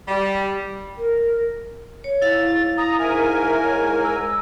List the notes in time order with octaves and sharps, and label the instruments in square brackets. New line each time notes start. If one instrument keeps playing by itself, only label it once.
[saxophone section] G3
[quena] A#4
[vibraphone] C#5
[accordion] G#2 [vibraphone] E4 F5 [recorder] A6
[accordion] A#5 [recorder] D#6
[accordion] G#2 A#4 G#5 [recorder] E5
[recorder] C#5
E6